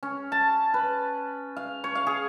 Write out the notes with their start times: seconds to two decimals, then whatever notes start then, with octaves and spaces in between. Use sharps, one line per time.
0.03 C#4
0.32 A5
0.74 B4
1.57 F5
1.84 C#5
1.95 F5
2.07 G#4